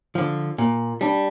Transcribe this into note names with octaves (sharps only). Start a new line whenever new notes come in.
D3 F3
A#2
G3 D4